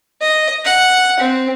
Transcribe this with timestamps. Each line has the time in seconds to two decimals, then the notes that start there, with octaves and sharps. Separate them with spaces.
0.21 D#5
0.65 F#5
1.20 C4